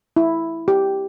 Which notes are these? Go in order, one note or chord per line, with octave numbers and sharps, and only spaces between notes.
E4
G4